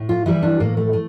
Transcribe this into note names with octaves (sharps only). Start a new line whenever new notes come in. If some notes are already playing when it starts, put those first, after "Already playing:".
Already playing: A2
F4
E3 G3 E4
D4
A2 A#3
A3
A3